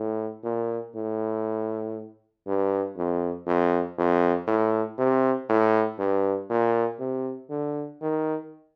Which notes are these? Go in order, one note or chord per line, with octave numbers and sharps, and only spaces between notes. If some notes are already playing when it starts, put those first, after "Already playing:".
Already playing: A2
A#2
A2
G2
F2
F2
F2
A2
C3
A2
G2
A#2
C3
D3
D#3